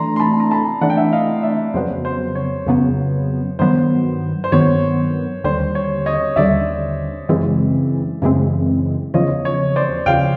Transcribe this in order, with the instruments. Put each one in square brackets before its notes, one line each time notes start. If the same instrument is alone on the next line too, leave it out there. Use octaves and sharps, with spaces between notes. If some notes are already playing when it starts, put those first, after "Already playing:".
Already playing: [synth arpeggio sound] E3 A3 D4 [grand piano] A#5 C6
[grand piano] C6
A5 B5
A#5
A5 B5
[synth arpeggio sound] E3 A3 D4 [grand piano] F#5
[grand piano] G5
E5 F#5
D#5 F5
D5 E5
[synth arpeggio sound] F2 C#3 F#3 B3 [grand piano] C5
[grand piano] C5
C#5
[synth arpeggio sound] F2 C#3 F#3 B3
[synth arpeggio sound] G2 D#3 F#3 B3 [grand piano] C5
[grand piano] C5
[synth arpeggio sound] G2 D#3 F#3 B3 [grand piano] C#5
[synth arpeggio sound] D#2 D3 G3 [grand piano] C5
[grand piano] C#5
C#5 D#5
[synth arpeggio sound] D#2 D3 G3 [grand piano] D5 E5
[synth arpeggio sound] F#2 C#3 E3 G#3 C4
F#2 C#3 E3 G#3 C4
[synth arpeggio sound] E2 C#3 F3 [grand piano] C#5 D#5
[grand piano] C#5
C5 D5
[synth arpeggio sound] E2 C#3 F3 [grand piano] F5 G5